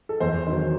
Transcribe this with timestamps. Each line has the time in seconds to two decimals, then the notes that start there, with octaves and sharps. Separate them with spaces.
0.09 A4
0.20 E2 C5
0.47 D#3 F#3 C5